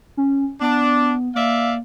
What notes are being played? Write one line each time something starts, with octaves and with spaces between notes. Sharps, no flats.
C#4
B3 D4
A#3 D5 E5 F5